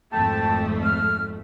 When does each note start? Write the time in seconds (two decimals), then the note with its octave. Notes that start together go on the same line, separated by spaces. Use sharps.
0.12 G#1 F2 A3 G5 A5
0.83 F6